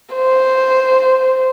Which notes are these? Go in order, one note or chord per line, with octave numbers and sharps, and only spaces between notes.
C5